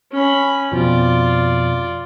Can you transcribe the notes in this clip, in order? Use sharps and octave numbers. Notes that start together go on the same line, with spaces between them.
C#4 B5
F2 B2 F3 F4 D5